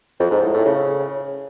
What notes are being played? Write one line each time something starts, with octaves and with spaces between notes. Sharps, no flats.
F2
G#2
A2
A2
C#3